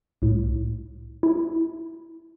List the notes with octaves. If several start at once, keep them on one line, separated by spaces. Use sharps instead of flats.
C2 A2
E4